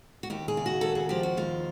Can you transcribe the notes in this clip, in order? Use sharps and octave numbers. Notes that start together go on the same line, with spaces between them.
F#4
D#2 G4
G#4
C#3
F#4
D#2 A4
G#4
F3 G4
F#4
D#2 F4